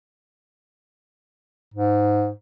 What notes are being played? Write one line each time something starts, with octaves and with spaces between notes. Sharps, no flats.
G#2